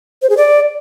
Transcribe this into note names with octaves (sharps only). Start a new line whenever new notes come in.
C5
G#4
D5